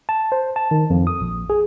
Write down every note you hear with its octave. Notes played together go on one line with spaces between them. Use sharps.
A5
C5
A5
D#3
F2
D#6
A#1
G#4